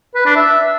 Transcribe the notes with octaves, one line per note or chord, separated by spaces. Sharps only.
B4
D4
E5